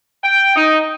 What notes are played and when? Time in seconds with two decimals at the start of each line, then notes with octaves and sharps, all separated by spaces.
0.24 G5
0.56 D#4